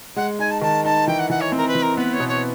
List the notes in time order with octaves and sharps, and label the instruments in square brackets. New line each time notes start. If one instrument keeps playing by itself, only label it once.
[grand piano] G#3 [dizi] F#5
[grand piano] D#4 [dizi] G#5
[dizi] A5
[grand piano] D#3 [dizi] A5
[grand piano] D#4 [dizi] A5
[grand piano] E3 [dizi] G5
[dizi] F#5
[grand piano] E3 [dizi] F#5
[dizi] C#5
[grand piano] C4 [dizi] A#4
[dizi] B4
[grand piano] E3
[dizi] A#4
[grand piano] B3 [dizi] B4
[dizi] C#5
[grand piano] B2
[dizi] C#5